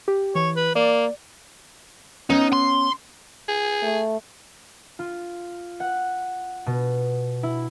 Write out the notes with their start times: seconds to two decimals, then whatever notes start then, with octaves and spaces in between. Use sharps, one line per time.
0.08 G4
0.35 E3 C#5
0.56 B4
0.75 A#3 D5
2.30 B3 C#4 D#4
2.53 C6
3.48 G#4
3.82 A3
4.99 F4
5.80 F#5
6.66 B2
7.43 E4